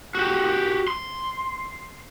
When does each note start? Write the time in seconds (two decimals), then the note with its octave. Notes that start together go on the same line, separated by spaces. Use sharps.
0.15 F#4 G4
0.88 C6